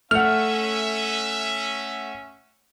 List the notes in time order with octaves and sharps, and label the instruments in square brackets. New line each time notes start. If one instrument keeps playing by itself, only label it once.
[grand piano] A3 F#5 [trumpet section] C#4 E5 [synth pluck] F6